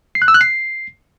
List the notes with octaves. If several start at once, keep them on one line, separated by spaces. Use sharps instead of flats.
C7
F#6
E6
F#6
C7